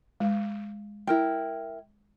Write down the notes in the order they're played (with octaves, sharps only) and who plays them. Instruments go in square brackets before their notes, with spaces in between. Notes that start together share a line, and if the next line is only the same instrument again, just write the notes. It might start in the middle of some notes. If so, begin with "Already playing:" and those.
[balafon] G#3
[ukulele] E4 A#4 G5